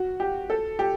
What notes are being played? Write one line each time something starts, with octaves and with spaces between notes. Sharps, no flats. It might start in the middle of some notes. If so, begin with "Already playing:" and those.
Already playing: F#4
G4
A4
G4